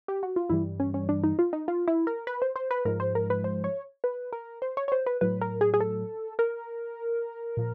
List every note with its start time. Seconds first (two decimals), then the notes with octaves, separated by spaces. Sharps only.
0.08 G4
0.23 F#4
0.36 F4
0.50 G2 E3 G3 E4
0.80 C#4
0.94 C#4
1.09 D4
1.24 D#4
1.39 F4
1.53 D#4
1.68 F4
1.88 E4
2.07 A#4
2.27 B4
2.42 C5
2.56 C5
2.71 B4
2.85 G#2 F3 G#3 A#4
3.00 C5
3.15 A#4
3.30 B4
3.44 C5
3.64 C#5
4.04 B4
4.33 A#4
4.62 C5
4.77 C#5
4.88 C#5
4.92 C5
5.06 B4
5.21 A2 F#3 B4
5.41 A#4
5.61 G#4
5.74 G#4
5.80 A4
6.39 A#4
7.57 A#2 F3